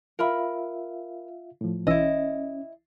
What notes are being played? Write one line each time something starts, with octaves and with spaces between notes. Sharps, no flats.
F4 A#4 E5 F5 B5
A2 F3
B1 E3 C#4 E4 D#5 E6